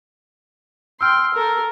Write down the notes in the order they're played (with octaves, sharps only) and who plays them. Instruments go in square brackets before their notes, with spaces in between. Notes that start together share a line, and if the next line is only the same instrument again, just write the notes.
[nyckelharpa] G5 C6 [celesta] E6 F6
[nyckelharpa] A4 A#4